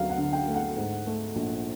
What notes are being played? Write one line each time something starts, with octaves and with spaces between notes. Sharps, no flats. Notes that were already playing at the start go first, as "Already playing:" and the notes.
Already playing: D2 F#3 F5
F#5
D3
G5
A3
F#5
G#2
A3
A#1